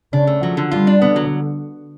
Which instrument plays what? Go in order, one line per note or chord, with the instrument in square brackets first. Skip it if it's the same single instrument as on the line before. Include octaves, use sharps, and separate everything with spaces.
[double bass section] C#3 [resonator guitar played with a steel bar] D4
[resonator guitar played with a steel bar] A3
[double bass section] F3 [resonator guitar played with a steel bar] F#3
[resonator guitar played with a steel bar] D3
[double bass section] G3 [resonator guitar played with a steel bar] F4
[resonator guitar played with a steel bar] D4
[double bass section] D3 [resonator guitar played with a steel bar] B3
[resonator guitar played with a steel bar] F#3